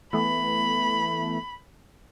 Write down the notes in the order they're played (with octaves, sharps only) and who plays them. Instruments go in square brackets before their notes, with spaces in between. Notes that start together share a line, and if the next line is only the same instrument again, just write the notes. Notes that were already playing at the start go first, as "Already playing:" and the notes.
[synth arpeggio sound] E3 A3 B3 [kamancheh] B5